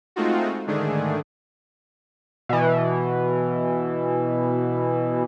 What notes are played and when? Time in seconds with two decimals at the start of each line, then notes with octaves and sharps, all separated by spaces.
0.16 G#3 A3 C4 D#4 F4 F#4
0.67 G#2 D3 D#3 A3 D4 G#4
2.49 B2 E3